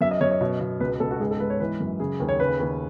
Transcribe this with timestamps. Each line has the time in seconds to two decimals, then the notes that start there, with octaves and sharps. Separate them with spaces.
0.01 F#2 E5
0.11 D#5
0.21 F#2 C#5
0.31 C#5
0.41 B2
0.60 B2
0.80 C#2 B4
1.00 C#2 A4
1.11 F#4
1.20 G#2 G#4
1.31 A4
1.40 G#2 B4
1.50 C#5
1.60 E3 B4
1.80 F#2
2.00 C#3 G#4
2.20 D#2
2.29 C#5
2.40 C#3 B4
2.59 D#2